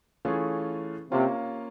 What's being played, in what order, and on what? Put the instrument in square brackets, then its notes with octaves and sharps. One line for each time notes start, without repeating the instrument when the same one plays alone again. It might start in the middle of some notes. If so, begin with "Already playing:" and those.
[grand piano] E3 A3 C#4 F4 G#4
[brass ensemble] C3 [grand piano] A#3 C#4 F4